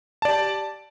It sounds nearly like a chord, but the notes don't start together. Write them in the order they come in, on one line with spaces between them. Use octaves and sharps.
A5 D5 G4